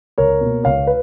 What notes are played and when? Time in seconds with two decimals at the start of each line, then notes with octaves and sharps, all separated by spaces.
0.18 C#2 A#4 C#5
0.41 B2 A#3
0.64 C#2 C#5 F5
0.87 B4